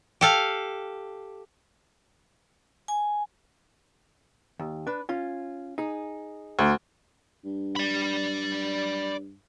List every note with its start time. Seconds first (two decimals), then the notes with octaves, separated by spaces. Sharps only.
0.21 G4 A4 F5
2.88 G#5
4.59 D#2
4.87 D4 B4
5.09 C#4 F4
5.78 D#4 G#4
6.59 D2
7.45 G2
7.76 D5 B5